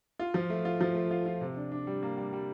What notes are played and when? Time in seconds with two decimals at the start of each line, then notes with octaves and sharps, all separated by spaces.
0.19 F4
0.34 F3
0.50 A3
0.65 F4
0.81 F3
0.95 A3
1.11 F4
1.26 F4
1.41 C3
1.57 D4
1.72 D4
1.87 G3
2.03 A#3
2.17 G3
2.33 G3